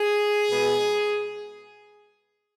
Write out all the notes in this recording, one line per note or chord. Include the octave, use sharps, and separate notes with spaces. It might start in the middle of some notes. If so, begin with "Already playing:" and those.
Already playing: G#4
B2 G#3 B3